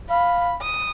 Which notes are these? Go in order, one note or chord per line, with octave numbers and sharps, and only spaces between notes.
F5 B5
D#6